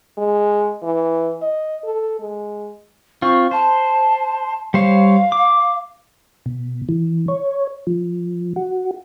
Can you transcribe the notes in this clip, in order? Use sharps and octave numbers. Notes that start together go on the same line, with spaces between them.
G#3
E3
D#5
A4
G#3
C4 F4 C#6
C5 A5
G3 C5 C#5 F5
D6
B2
E3
C#5
F3
F#4